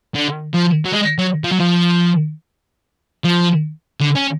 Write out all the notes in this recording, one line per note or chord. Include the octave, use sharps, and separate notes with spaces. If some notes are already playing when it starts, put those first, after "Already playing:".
D3
F3
F#3
G#3
F#3
F3
F#3
F3
F3
D3
C#4